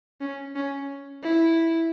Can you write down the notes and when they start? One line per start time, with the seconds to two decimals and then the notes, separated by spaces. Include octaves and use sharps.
0.21 C#4
0.56 C#4
1.23 E4